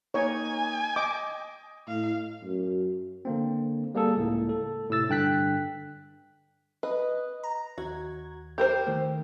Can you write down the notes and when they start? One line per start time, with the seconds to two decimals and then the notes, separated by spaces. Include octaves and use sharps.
0.14 A#3 D#4 C#5 G#5
0.96 D#5 D6
1.88 A2 F5
2.43 F#2
3.25 D3 A#3 C4
3.95 G3 A#3 G#4 A4
4.17 C#2 A2 A#3
4.49 A4
4.90 A2 C3 E6 A6
5.09 G2 D3 G5 F#6 B6
6.83 B4 D#5
7.43 A#5
7.78 D#2 F#4 G#6
8.58 G4 A#4 C5
8.87 D#3 A3